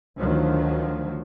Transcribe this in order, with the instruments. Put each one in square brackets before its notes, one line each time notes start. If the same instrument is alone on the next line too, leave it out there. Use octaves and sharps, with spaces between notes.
[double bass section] D2 D#3 F3 F#3